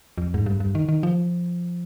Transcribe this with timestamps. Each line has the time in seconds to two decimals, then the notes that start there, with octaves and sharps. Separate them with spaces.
0.18 F2
0.34 G#2
0.46 G2
0.60 G2
0.75 D#3
0.89 D#3
1.03 F3